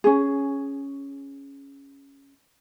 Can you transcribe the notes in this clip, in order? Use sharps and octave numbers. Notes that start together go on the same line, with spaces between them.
C#4 G#4